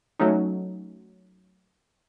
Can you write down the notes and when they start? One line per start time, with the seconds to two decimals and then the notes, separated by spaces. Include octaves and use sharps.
0.19 F#3 A3 C#4 D#4